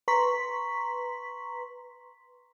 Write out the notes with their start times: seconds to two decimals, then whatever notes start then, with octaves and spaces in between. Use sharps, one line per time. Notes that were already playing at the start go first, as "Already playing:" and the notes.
0.08 B4 A#5 C6 C#6 B6